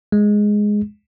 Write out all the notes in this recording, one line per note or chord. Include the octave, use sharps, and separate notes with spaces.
G#3